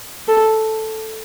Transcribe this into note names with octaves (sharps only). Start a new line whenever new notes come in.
A4